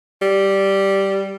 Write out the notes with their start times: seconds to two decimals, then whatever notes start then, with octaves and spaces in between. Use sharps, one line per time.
0.22 G3